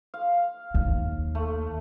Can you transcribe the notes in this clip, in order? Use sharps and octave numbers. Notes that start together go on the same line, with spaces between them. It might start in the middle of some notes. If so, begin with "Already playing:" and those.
F5
D#2
A3